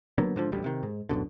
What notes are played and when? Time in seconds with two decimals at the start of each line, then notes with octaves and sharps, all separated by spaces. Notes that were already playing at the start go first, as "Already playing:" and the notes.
0.18 D3 F#3 A#3 B3
0.36 G#2 D3 F3
0.52 A1 D2 G3
0.64 C3 D#3
0.83 G#2
1.09 D1 F#2 B2 D3